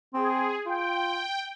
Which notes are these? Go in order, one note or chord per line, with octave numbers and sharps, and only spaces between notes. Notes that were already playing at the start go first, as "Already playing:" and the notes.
C4 G#4
F4 G5